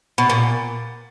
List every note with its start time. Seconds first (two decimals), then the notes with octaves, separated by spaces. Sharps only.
0.18 B2
0.30 A#2